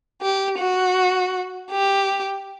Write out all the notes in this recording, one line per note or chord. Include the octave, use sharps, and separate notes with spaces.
G4
F#4
G4